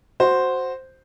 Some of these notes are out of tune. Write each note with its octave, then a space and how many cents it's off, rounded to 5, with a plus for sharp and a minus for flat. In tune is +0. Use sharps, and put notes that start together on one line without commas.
F#4 +0 C5 +0